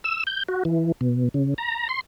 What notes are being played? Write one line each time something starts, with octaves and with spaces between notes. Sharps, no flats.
E6
G6
F#4
E3
B2
C#3
A#5
C6